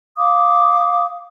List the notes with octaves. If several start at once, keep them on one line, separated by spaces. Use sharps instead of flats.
F5 D6 D#6